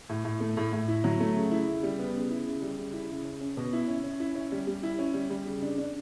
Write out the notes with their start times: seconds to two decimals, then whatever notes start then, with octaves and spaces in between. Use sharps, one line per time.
0.09 A2
0.25 A2
0.40 A3
0.57 A2
0.73 A2
0.88 E4
1.04 F#3
1.20 A3
1.35 C#3
1.51 E4
1.67 C#3
1.83 G3
1.99 B3
2.14 C#3
2.30 E4
2.46 C#3
2.62 G3
2.77 C#3
2.93 E4
3.09 C#3
3.25 C#4
3.41 C#4
3.57 B2
3.73 E4
3.88 C#4
4.04 C#4
4.20 E4
4.35 C#4
4.52 G3
4.67 G3
4.83 E4
4.99 C#4
5.14 G3
5.30 G3
5.46 C#3
5.62 D4
5.78 D4